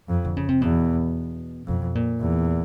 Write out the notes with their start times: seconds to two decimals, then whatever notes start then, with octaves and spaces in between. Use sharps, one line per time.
0.09 F2
0.25 D3
0.37 C#3
0.48 C3
0.61 E2 B2
1.68 F2 B2
1.95 A#2
2.22 E2